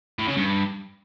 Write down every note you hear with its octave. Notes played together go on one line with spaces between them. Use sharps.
A2
C#3
G2